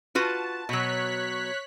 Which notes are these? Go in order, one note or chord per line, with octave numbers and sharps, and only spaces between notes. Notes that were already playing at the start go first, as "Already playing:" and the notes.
F4 F#4 B4 A5
B2 F#3 C#5 F#6 B6